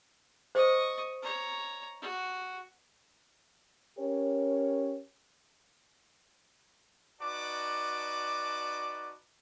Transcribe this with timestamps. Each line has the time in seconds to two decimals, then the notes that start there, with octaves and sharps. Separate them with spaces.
0.55 C5 D#5 C#6
1.22 C#5 A#5
2.02 F#4
3.98 C#4 G4 A#4 C#5
7.22 D#4 F#4 B4 D5 A5 D6